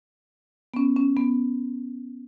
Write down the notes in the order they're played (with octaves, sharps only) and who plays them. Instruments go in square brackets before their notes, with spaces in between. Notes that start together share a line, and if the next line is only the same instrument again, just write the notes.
[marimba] B3
C#4
C#4
B3